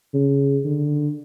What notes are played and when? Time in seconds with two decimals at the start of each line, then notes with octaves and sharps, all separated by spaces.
0.14 C#3
0.66 D3